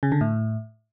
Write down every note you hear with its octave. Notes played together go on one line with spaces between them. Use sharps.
C#3
D3
A2